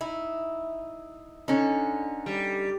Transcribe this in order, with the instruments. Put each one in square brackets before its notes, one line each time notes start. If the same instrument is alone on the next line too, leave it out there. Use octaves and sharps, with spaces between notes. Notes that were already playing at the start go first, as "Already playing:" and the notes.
[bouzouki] D#4 E4
[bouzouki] D3 [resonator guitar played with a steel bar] C#4 D#4
[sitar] G3